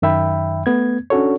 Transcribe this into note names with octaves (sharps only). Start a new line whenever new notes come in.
F#2 D#3 E5 G5 B5
A3 B3 G#6
C#4 D4 F#4 A4 C#5